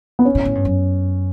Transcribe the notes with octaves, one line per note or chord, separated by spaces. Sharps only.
B3
C#4
A2
A2
G2
F#2